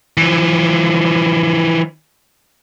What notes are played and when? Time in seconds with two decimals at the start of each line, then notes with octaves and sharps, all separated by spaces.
0.17 E3 F3